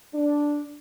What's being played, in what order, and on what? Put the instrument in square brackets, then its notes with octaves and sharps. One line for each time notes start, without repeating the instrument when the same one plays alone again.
[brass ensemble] D4